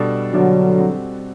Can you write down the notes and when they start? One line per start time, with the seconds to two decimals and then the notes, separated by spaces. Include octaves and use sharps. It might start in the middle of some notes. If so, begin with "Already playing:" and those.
Already playing: B2 G3 D4 A4
0.33 B2 D3 F#3 G3 D4 A4
0.76 G3 C4 F#4 A4